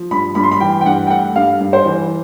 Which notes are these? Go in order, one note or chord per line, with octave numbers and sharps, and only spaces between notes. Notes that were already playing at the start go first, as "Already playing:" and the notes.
Already playing: F3
G2 B5
G2 B5
C6
B5
E3 G5
G5
G2 F#5
G5
A3 F#5
G2 F5
G2
C5
E3